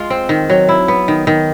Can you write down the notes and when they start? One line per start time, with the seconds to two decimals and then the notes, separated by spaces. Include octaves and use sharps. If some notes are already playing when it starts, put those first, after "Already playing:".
Already playing: G#3 F4
0.10 C4
0.29 D#3
0.50 F#3
0.69 E4
0.88 B3
1.08 D#3
1.27 D#3